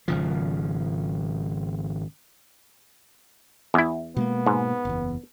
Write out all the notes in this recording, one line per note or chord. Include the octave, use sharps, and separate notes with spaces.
G#1 C#3 F3
E2 E4
B2 G#3 A#3 B3
G#2
F#1 E2